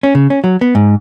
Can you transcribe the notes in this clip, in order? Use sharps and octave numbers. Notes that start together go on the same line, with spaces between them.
C#4
C#3
C#4
F#3
B3
G#2